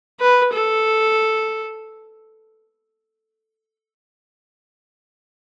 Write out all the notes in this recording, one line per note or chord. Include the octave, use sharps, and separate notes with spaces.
B4
A4